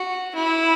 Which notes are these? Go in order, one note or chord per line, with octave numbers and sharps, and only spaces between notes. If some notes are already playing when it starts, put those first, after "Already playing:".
Already playing: F#4
E4